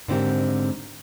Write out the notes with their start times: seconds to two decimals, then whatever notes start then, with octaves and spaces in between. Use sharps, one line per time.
0.08 G#2 D3 C4 E4 G4 A#4